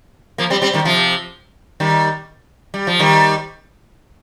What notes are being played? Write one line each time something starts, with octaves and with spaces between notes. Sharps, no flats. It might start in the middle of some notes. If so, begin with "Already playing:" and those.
F3 A#3
G3 C4
G3 C4
D#3 G3
C3 F3
D#3 G3
G3
F3
D#3 G3